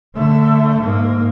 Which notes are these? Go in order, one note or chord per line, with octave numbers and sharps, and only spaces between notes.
D3 A3
G#2 A#3